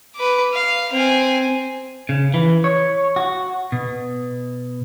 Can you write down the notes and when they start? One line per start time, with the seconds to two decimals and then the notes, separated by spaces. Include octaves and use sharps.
0.16 B4 D6
0.54 F5
0.92 C4 G#5
2.09 C#3
2.34 E3
2.64 C#5
3.16 F#4
3.72 B2